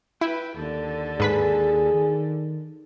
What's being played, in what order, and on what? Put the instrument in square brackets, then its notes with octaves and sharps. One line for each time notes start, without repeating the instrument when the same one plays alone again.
[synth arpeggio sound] E4 [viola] B4 G5
[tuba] D#2 [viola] D3 A4
[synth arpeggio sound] G#2 B4 B6 [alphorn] G#4
[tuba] D#3